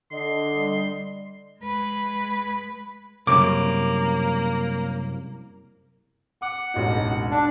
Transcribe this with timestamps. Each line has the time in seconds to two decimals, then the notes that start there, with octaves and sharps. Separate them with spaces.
0.12 D3 D#5 C6
0.54 G3
1.60 G#3 B4
3.27 C2 F#2 C#3 A#3 D6
6.42 F#5 D6
6.74 E1 A1 D#4
7.31 D4